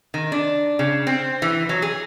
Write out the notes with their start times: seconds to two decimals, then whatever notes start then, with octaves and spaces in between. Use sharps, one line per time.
0.14 D#3
0.32 D4
0.79 C#3
1.07 C4
1.42 E3
1.69 F#3
1.82 G#4